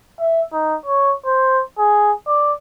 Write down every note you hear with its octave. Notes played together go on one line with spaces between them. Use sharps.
E5
D#4
C#5
C5
G#4
D5